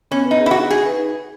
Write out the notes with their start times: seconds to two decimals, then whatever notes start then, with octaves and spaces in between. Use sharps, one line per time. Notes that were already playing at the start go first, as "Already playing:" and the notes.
0.11 B3 C#4
0.25 B4
0.31 D#4
0.40 G#4
0.46 E4
0.51 F#4
0.55 D#4
0.70 D#4 G#4
0.86 B4